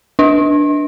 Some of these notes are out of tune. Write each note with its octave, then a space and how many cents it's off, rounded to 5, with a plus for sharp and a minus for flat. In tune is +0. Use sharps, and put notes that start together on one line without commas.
D4 +0 D#5 +40